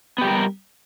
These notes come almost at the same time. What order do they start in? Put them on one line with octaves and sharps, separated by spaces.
B3 G4 G3 A#4